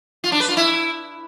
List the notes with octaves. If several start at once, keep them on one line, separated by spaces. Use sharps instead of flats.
F4
D4
B4
F4
E4